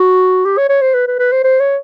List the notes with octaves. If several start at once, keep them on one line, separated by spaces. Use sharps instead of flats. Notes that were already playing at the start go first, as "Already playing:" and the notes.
Already playing: F#4
G4
C#5
C#5
C5
B4
B4
B4
C5
C5
C#5